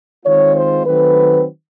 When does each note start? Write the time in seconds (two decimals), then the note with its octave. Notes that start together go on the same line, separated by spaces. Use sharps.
0.24 D#3 G#3 C4 F4 C#5
0.55 C5
0.85 D#3 F#3 A3 C4 B4